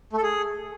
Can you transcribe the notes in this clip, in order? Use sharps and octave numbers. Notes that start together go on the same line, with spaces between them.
A3
A4
G#4